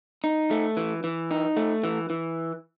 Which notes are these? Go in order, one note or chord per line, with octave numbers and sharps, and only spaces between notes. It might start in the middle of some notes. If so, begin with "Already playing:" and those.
D#4
A3
E3
E3
D#4
A3
E3
E3